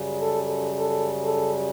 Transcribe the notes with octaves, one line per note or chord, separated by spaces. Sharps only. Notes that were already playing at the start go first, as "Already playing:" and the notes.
Already playing: F#2 C#3 G3
A4
A4
A4
A4